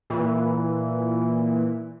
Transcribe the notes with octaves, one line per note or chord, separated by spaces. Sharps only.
A#2 E3